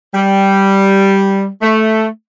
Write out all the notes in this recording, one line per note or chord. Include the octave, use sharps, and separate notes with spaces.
G3
A3